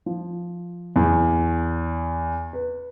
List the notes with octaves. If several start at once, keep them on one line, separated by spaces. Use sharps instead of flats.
F3
E2
B4